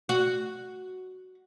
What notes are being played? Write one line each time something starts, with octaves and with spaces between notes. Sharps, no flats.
F#4